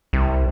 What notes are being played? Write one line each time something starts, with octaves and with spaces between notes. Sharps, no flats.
C2